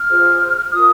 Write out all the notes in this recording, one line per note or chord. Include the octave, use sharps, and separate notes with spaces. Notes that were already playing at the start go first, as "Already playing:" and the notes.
Already playing: F6
F4 G#4 C5
F4 A#4 D#6